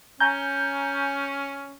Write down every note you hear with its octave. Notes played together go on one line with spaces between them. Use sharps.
C#4 G#5 A#5 G6